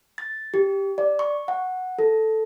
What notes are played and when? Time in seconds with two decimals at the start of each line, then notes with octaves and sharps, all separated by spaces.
0.18 A6
0.54 G4
0.98 D5
1.19 C#6
1.48 F#5
1.99 A4